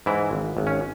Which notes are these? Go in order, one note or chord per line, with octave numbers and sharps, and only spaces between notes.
G#2 E3 E4
G#1
G#1
C#4